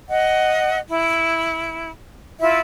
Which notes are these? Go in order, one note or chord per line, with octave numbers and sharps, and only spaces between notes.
D#5 F#5
E4
E4 F4 E5